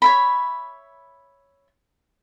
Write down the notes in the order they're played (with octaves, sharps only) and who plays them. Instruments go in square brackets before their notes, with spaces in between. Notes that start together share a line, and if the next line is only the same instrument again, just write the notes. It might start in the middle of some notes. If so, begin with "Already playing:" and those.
[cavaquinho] C#5 E5 B5